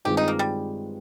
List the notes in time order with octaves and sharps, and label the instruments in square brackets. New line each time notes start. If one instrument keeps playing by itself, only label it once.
[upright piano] G2 D#3 G#3 C4 F4 [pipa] G4
[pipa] D#4
A#3
G3